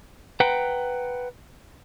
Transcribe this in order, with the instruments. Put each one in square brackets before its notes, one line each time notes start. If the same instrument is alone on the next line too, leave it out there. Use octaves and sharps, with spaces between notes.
[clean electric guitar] B4 F#5 G5 A#5